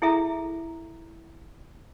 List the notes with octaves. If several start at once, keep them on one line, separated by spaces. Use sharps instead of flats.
E4 G#4 A4 E5 A#5